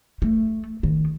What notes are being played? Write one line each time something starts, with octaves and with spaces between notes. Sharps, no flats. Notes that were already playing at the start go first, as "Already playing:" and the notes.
A3
D#3